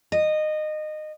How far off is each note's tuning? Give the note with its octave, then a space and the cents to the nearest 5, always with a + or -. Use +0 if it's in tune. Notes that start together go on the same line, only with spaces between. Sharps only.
D#5 -20